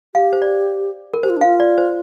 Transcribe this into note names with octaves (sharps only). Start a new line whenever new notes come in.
G4 F5
C5
D5
A#4
G4 C5
F4
D4
F5
F4
D5
C5